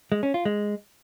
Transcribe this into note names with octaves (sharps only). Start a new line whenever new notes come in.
G#3
C#4
F4
G#3